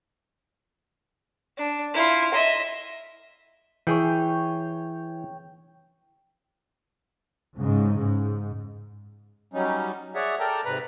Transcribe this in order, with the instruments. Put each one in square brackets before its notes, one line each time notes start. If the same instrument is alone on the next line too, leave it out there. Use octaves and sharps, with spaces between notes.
[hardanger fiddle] D4
E4 F4
D#5 E5
[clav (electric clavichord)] E3 G#4 [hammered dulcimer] C#5 G5
[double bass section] G#2 C#3
G#2
[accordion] F#3 G3 C#4 D#4
G#4 C#5 D5 E5 F#5
A4 A#4 D5 G5 A5 A#5
G#2 C3 B4 A#5 B5